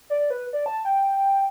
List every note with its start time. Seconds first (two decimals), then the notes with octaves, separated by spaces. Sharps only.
0.10 D5
0.30 B4
0.53 D5
0.66 A5
0.85 G5